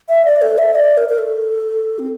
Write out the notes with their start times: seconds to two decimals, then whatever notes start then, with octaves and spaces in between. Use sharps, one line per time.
0.09 E5
0.25 D5
0.42 A4
0.58 E5
0.75 D5
0.97 A#4
1.09 A#4
1.18 A4
1.99 C4